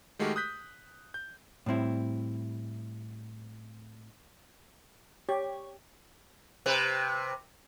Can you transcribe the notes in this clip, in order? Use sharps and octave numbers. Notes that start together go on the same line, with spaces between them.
D#3 G#3 A3 F#4 G4 A#4
D#6 F#6 G6 B6
G6
A2 G3 C4 E4
G4 C#5
C3 B4